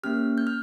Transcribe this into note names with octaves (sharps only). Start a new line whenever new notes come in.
A#3 C#4 G4 F6
G6
F6